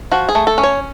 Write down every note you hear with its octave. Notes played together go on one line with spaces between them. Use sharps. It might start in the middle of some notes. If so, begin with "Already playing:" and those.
F3 F#4
G#4
A3
A4
C#4
C#5